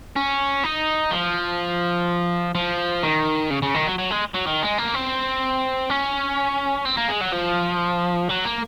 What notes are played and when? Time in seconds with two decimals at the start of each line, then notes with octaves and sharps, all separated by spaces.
0.16 C#4
0.64 D#4
1.11 F3
2.55 F3
3.03 D#3
3.50 C#3
3.62 C#3
3.74 D#3
3.87 F#3
3.98 F#3
4.11 G#3
4.34 F#3
4.46 D#3
4.63 G#3
4.78 A#3
4.94 C4
5.90 C#4
6.85 C4
6.97 A#3
7.09 G#3
7.21 F#3
7.33 F3
8.29 F#3
8.45 A#3